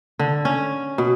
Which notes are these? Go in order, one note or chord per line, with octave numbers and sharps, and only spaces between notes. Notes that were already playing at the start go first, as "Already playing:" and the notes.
D3
C#4
B2